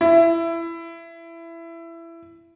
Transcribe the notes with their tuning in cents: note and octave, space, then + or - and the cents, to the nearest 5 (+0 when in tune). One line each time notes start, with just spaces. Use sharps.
E4 +20